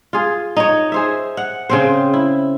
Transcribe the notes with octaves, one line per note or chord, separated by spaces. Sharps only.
F4 G#4
D#4 C#5
G#4 C5 E5
F#5
C#3 C4 C5
E4